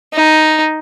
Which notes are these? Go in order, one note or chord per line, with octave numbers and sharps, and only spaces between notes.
D#4